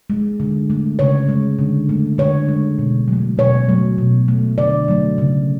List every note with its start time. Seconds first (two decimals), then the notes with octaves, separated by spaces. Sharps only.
0.10 G#3
0.40 D3
0.70 A3
0.99 C#3 C#5
1.29 G#3
1.59 D3
1.89 A3
2.18 D3 C#5
2.48 G#3
2.78 B2
3.08 F#3 A3
3.38 B2 C#5
3.69 F#3 A3
3.98 B2
4.28 A3
4.58 D3 D5
4.88 F#3 A3
5.18 C#3